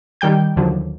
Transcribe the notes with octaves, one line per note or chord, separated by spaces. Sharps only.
D#3 G3 G5 G6
D#2 D3 F3 F#3